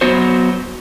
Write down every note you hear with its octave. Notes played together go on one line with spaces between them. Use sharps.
F#3 B3 F#4 C5